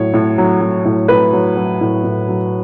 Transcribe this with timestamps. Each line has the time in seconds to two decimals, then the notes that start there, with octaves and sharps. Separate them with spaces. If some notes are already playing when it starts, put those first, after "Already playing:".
Already playing: A2 F#3 C#5
0.14 A2
0.38 F#3
0.61 F#3
0.85 A2
1.08 A2 B4
1.33 F#3
1.57 F#3
1.81 A2
2.04 A2
2.28 F#3